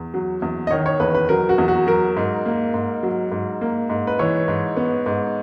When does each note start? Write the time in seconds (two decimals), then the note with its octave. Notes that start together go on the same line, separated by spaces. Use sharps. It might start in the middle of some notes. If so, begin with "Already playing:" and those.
Already playing: E2
0.14 F#3
0.42 E2
0.67 D#5
0.71 D#3 C#5
0.86 C#5
1.00 E2 B4
1.15 B4
1.29 F#3 A#4
1.49 F#4
1.58 E2
1.68 F#4
1.87 F#3 A#4
2.17 G#2
2.46 A#3
2.74 G#2
3.03 F#3
3.32 G#2
3.61 A#3
3.90 G#2
4.07 B4
4.19 E3 C#5
4.48 G#2
4.77 B3
5.06 G#2